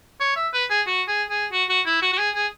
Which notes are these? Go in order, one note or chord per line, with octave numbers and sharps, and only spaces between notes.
C#5
E5
B4
G#4
F#4
G#4
G#4
F#4
F#4
E4
F#4
F#4
G#4
G#4